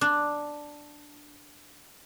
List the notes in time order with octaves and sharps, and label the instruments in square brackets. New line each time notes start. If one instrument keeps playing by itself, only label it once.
[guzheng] D4